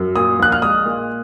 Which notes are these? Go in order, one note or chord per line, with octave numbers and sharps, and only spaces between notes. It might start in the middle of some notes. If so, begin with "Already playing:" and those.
Already playing: F#2
A#2 D#6
A#1 F#6
F6
G#3 D#6
A#2